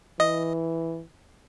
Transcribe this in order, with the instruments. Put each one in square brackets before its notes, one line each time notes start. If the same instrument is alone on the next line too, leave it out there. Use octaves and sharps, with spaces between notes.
[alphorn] E3 [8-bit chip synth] D#5